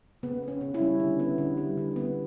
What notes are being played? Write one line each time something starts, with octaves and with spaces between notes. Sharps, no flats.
C#3 B3
B3
C#4
C#3
C#4 E4
G3
D3
B3
D3
G3
D3
B3